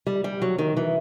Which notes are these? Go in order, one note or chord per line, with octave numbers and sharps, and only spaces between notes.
G3
G3
F#3
D#3
E3